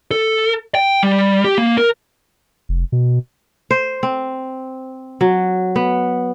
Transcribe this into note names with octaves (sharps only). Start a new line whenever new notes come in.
A4
G5
G3
G4
A#3
A#4
F1
B2
C5
C4
F#3
B3